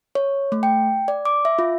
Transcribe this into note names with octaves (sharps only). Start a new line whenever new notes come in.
C#5
A3
G5
D5
D6
E5
F4